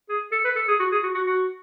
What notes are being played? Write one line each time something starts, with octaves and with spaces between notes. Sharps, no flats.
G#4
A4
B4
A4
G#4
F#4
G#4
F#4
F#4
F#4